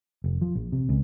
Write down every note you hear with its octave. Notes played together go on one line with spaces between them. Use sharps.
F1
F3
A#1
C3
C#2